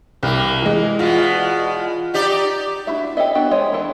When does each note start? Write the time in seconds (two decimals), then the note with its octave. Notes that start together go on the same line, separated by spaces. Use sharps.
0.23 C2 A#3
0.62 E3 G#3
0.99 E2 B2 G#3 F4
2.14 D#4 G4 D5
2.87 D4 E4 F#4 E5
3.17 G4 A4 C#5 D#5 E5
3.35 B3 D4 F#4 G5
3.51 G#3 C5 C#5 D#5
3.73 E3 D4 A4 A5